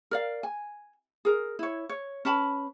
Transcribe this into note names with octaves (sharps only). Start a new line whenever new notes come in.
A#4 D5 F5
G#5
G#4 A#4
E4 C#5
C#5
C#4 B4 A5 B5